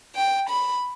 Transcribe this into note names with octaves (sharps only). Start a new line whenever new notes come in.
G5
B5